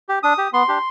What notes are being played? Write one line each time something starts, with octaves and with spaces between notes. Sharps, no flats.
G4
D4 D#6
G4
B3 C6
D4 G4